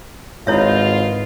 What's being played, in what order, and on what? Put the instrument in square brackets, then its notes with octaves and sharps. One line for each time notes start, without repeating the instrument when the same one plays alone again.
[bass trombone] G#1 [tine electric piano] G#2 B4 D#5 [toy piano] E4 C#5 E5 [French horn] F4